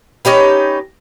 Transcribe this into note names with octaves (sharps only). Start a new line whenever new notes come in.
C#4 D#4 G4 B4